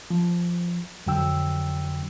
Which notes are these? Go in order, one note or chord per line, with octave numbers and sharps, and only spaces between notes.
F3
F2 D3 F#3 G5 E6